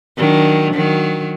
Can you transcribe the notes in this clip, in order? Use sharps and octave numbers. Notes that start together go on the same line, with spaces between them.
D#3 F#3 D4
D#3 F#3